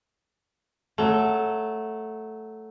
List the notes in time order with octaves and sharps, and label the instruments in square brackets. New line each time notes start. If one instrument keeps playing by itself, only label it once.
[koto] F#3 A3